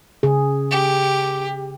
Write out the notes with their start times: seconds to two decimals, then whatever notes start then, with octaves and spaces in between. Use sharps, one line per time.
0.23 C#3 G#4
0.71 G4